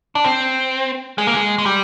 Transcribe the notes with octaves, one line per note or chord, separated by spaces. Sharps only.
D4
C4
G#3
A#3
G#3
G#3
G3